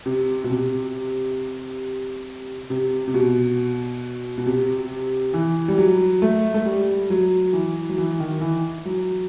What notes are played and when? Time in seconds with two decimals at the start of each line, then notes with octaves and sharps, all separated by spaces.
0.06 C3
0.44 B2
0.50 C3
2.70 C3
3.07 C3
3.14 B2
4.38 B2
4.46 C3
5.33 E3
5.68 G3
5.78 F#3
6.22 A3
6.54 A3
6.66 G3
7.10 F#3
7.53 E3
7.89 F#3
7.98 E3
8.20 D#3
8.41 E3
8.85 F#3